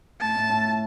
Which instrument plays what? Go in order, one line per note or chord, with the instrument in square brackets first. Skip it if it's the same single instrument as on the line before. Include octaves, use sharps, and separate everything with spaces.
[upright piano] A2 [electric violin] A5
[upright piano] A2
A2
A2